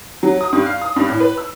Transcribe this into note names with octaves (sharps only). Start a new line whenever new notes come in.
F#3
D#6
G2
F5
D#6
G2
A2
B4
E6